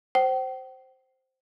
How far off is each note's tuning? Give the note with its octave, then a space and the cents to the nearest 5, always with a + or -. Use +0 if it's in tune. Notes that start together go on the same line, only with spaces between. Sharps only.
C5 +0 G5 -45